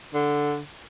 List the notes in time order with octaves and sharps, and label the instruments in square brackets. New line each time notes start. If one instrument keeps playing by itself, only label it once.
[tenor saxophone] D3